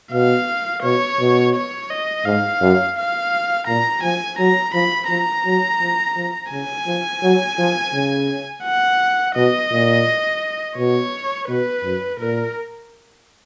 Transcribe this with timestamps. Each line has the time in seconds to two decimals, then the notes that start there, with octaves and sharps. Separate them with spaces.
0.12 B2 F5
0.83 B2 C#5
1.19 B2
1.55 C#5
1.90 D#5
2.25 G#2 F5
2.61 F#2
2.97 F5
3.67 A#2 A#5
4.03 F3 G#5
4.39 F#3 A#5
4.74 F3 B5
5.09 F3 A#5
5.45 F#3
5.80 F3
6.16 F3
6.52 C#3 G#5
6.87 F3
7.23 F#3
7.59 F3
7.93 C#3
8.64 F#5
9.36 B2 D#5
9.71 A#2
10.78 B2 C#5
11.48 B2 B4
11.84 F#2
12.20 A#2 A#4